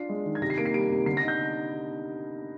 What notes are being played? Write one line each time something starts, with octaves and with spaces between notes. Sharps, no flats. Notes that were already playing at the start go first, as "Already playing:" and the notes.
Already playing: D4 F4 C7
G#3
D#3
G#6
C3 A#6
C7
A#3 D7
C7
G3 D7
C3
D3 C7
A#6
D#4
G6